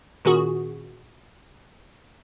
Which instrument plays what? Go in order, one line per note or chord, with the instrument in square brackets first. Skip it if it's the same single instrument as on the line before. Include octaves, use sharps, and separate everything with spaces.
[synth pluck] A#2 D#3 C#4 F#4 G#4